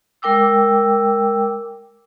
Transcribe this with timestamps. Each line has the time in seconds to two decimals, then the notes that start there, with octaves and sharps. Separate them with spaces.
0.22 G#3 A#4 G5 D6 E6